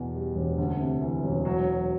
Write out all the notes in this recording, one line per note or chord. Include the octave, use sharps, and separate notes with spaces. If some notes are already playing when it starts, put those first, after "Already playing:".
Already playing: E2 B2
G3
E1
D2
C3
E3
E1
F#3